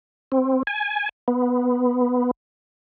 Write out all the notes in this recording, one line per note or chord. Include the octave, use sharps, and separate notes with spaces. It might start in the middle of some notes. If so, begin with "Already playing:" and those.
C4
G#5
B3